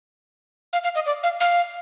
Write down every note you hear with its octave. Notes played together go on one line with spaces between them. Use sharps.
F5
F5
D#5
D5
F5
F5